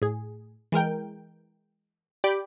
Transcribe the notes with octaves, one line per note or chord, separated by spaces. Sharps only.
A2 G#4
E3 G#3 A#4 G5
G4 D5 G5 B5 D6